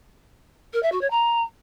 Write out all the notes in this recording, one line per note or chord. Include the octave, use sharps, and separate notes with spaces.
A#4
E5
F#4
C#5
A#5